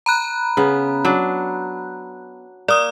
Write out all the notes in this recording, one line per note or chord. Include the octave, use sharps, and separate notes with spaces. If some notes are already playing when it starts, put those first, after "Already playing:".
A#5 B5 F#6
C#3 B3
F#3 D4
A#3 D5 D#6